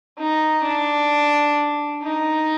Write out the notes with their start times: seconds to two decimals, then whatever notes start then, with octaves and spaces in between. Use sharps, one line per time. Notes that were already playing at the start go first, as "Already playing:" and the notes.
0.18 D#4
0.64 D4
2.03 D#4